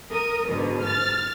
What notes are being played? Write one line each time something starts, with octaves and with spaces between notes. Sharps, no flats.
A#4 D#6
G#2 B2 D3
F6 A6